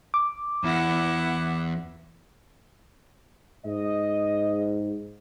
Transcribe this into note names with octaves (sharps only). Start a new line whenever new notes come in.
D6
E2 E4 F#5
G#2 D#5